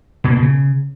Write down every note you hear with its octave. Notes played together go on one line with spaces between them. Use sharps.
B2
A#3
B2
C#3